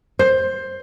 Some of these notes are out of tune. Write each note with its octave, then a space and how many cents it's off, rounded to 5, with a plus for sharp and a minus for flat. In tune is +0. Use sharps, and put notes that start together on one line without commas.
C5 +10